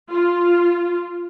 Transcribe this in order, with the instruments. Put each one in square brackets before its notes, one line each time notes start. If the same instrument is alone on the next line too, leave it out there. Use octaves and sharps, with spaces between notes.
[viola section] F4